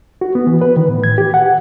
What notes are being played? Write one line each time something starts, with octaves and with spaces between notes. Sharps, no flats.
F#4
B3
E3
B4
D#3
A2
G#6
G4
F#5